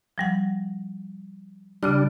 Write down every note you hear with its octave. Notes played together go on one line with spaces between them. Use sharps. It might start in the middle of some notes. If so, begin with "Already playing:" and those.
F3 G3 F#5
C#3 G3 D4 D6 F6